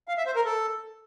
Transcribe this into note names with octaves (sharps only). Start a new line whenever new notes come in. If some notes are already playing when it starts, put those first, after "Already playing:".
F5
E5
C5
A#4
A4